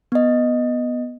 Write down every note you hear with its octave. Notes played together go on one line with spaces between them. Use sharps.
B3 D#5